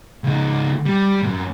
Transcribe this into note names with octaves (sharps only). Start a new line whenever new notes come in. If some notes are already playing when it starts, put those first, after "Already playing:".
C#2 D#4
G3
C2 F#2